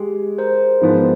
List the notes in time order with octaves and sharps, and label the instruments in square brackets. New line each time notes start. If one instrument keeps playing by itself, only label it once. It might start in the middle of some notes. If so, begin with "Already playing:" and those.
Already playing: [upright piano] G#3 [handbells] G4
[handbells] A#4 C5
[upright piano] G#2 F3 G#3 B3